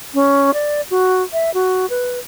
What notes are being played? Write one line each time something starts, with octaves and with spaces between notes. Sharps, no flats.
C#4
D5
F#4
E5
F#4
B4